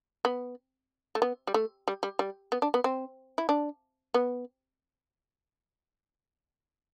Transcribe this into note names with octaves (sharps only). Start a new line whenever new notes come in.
B3
A3
B3
G3
A3
G3
G3
G3
B3
D4
B3
C4
E4
D4
B3